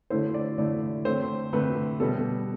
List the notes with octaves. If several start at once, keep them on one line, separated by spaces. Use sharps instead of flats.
D3 A3 E4 C5
D5
D3 A3 E4 D5
D3 A3 C4 C5
D3 A3 C4 B4
B2 G3 B3 A4